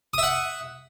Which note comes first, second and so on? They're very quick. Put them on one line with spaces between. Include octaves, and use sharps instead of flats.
D#6 E5 F#5